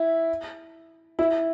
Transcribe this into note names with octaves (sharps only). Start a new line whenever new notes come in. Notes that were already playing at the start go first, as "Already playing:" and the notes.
Already playing: E4
E4